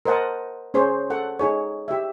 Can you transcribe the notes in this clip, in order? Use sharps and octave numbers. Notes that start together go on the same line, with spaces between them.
A#4 C5 D#5 F#5 A5
C#4 G#4 C5 C#5
A4 F#5
D#4 G#4 C#5
G4 E5